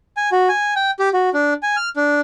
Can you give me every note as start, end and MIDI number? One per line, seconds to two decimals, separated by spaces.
0.17 0.29 80
0.32 0.49 66
0.49 0.74 80
0.76 0.91 79
0.99 1.09 67
1.14 1.30 66
1.34 1.54 62
1.63 1.76 80
1.77 1.89 89
1.96 2.21 62